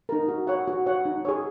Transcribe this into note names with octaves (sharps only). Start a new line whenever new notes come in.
D#4 A#4
F#4
C#5 F#5
F#4
C#5 F#5
D#4
G#4 C#5